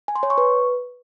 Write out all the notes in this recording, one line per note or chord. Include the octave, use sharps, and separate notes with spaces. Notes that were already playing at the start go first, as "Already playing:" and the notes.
G#5
C6
C#5
C#6
B4